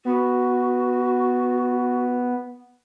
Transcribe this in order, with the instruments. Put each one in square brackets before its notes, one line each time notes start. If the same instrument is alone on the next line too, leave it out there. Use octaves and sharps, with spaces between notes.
[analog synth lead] B3 [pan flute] F#4